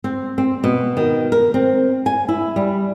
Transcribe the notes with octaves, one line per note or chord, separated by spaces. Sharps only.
C4
C4
B2
D#3
A#4
C4
G#5
E4
G3